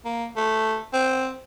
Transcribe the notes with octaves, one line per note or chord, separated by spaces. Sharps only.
A#3
A3
C4